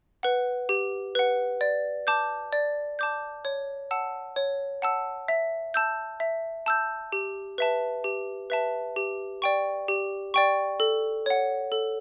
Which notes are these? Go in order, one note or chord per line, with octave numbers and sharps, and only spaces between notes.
B4 F#5
G4
B4 F#5
D5
A5 D6 G6
D5
A5 D6 G6
C#5
F#5 A5 E6
C#5
F#5 A5 E6
E5
A5 E6 G6
E5
A5 E6 G6
G4
B4 E5 A5
G4
B4 E5 A5
G4
D5 G5 C#6
G4
D5 G5 C#6
A4
C#5 F#5
A4